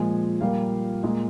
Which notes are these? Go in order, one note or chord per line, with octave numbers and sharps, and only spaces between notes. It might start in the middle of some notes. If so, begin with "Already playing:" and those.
Already playing: A#2 F3 G#3 G#5
A#2 G3 A#3 F5
A#2 G#3